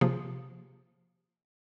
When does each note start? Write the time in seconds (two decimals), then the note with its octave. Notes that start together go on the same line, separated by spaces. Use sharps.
0.01 C3 F3 A#3 F4 G#4